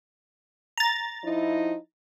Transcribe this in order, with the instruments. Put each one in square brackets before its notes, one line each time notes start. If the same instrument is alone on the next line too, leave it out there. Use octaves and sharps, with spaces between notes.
[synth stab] A#5 A6
[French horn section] F3 D#4 E4